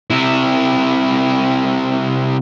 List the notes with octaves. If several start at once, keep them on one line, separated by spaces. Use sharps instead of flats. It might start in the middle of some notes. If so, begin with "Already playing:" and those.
C3 E4